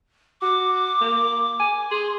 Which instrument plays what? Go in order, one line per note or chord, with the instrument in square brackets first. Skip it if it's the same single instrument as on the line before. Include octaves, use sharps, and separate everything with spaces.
[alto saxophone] F#4 [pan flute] D6
[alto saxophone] A#3
G#5
[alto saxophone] G#4 [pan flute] C6